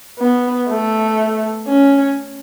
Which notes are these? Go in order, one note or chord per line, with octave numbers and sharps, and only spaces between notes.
B3
A3
C#4